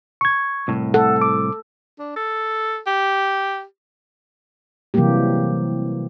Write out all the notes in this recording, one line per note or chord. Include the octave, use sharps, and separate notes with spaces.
C#6 G#6
C2 A2
A4 F#5
D6
D4
A4
G4
C3 E3 F#3 G3 A#3 G4